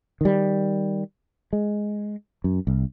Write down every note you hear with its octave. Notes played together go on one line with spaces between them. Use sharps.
D#3 G3
G#3
F#2
C2